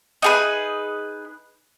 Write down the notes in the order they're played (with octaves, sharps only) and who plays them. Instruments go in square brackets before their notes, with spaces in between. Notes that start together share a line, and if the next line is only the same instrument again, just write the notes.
[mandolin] D#4 G#4 B4